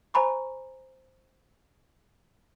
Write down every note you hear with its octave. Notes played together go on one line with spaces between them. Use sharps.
C5 G#5 A#5 B5 C#6